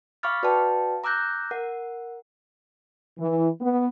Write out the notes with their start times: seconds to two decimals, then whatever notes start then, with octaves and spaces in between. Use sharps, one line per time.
0.23 F5 B5 C#6 D6 F6 A6
0.43 F#4 B4 D5 F5 G5 A5
1.04 A#5 D6 E6 F#6 G6 A#6
1.51 A#4 F#5
3.18 E3
3.60 B3